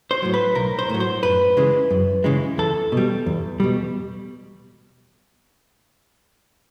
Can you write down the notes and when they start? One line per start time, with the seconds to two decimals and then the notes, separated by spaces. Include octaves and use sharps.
0.11 C5
0.22 A2 F#3
0.34 B4
0.55 B1 A#4
0.79 C5
0.90 A2 F#3
1.00 C5
1.23 F#2 B4
1.57 C#3 E3 G#3
1.90 F#2
2.24 C#3 E3 G#3
2.58 E2 A4
2.92 B2 G3
3.26 E2
3.60 B2 G3